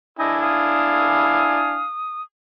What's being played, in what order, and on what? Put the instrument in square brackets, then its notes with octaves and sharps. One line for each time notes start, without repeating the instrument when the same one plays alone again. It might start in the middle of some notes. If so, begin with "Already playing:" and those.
[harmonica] D4 E4 G#5 [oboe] D#5
[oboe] F5 [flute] D#6